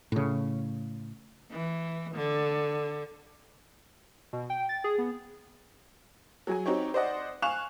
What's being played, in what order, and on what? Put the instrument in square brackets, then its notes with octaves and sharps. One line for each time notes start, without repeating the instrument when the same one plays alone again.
[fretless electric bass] A2 C#3
[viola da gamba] E3
D3
[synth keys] B2
G5
A6
G#4
B3
[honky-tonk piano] F#3 G#4 G#5
C4 D#4 F#4 G4 C#5
C5 D5 D#5 F#5
F5 G#5 C#6 F#6 E7 F7